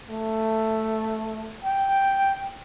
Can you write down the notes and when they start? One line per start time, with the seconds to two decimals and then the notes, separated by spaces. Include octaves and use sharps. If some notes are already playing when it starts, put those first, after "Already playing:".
0.10 A3
1.65 G5